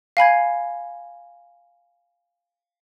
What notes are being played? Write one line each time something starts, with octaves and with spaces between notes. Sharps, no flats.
F5 G#5 B5 G#6